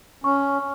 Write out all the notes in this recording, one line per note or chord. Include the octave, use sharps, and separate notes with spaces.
C#4 C#6